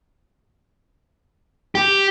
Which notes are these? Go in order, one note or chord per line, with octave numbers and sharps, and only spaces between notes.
G4